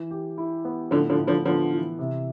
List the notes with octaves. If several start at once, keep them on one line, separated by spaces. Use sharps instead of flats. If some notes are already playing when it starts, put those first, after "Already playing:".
Already playing: E3
G4
E4
B3
A2 D3 F3
D3 F3
A2
D3 F3
D3 F3 B3
E3
C3